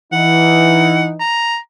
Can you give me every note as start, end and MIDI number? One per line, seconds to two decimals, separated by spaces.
0.13 1.18 52
0.13 1.18 63
0.13 1.08 78
1.20 1.57 82